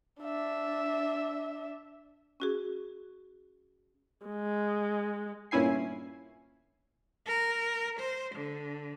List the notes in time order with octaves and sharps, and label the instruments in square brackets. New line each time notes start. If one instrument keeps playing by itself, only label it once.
[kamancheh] D4 E5
[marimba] C#4 F#4 G#4
[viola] G#3
[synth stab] G1 A#2 C#4 E4 G#5 C7
[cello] A#4
C5
D3